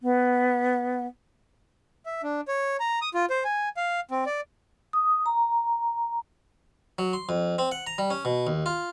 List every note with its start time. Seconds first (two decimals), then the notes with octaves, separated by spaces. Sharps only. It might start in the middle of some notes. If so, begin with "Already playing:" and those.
0.01 B3
2.06 E5
2.23 D4
2.48 C#5
2.80 A#5
3.02 D#6
3.14 F4
3.30 C5
3.44 G#5
3.77 F5
4.11 C4
4.26 D5
4.93 D#6
5.26 A#5
6.99 F#3
7.13 C6
7.29 F2
7.58 C4
7.72 F#5
7.87 A#5
7.98 G3
8.10 C#4
8.25 B2
8.47 D#2
8.66 F4